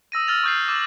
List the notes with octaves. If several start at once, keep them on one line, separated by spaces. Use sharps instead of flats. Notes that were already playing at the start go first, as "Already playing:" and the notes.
D#6 E6 A#6 D#7
E6 F6 A6 F7
C#6 D#6 G6 A6 C7
D6 E6 A6 E7 F#7